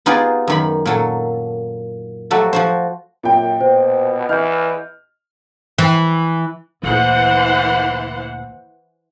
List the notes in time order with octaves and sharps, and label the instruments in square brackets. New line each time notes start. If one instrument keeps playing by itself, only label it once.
[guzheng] B3 D#4 F4 G4 G#4 D5
F#2 D#3 B5
A#2 F#3 A4
F3 F#3 A3 F#4 G4 A4
F3 F#4 C5
[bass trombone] F#2 [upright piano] A#2 G5
[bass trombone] B2 [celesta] C5
[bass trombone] E3 [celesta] D#5 G6 [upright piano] F6
[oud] E3
[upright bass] D2 A#2 [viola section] E3 C5 F#5